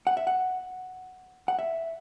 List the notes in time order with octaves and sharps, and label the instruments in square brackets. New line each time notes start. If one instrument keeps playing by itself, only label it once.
[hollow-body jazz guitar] F#5
E5
F#5
F#5
E5